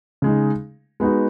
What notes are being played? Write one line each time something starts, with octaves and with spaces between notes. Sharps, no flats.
C#3 G#3 D#4
G#3 B3 D#4 F#4